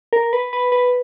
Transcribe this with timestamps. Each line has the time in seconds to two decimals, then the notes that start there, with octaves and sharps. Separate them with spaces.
0.13 A#4
0.33 B4
0.53 B4
0.72 B4